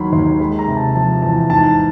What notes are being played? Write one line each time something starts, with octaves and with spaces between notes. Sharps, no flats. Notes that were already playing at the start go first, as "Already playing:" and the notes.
Already playing: D#2 D#3 F#3 B5 C6
D#2 C6
G#3 B5
A#5
C3
A5
F3 A5
E2 A5
G#2 A5